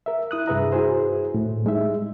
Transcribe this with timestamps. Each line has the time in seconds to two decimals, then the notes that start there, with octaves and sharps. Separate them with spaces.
0.06 A#4 E5
0.31 E4 D#6 F#6
0.47 G2 C3 G#4 B4 E5 A#5
0.72 E4 F#4 G#4 C5
1.34 A2
1.65 G3 G#3 D#4 E5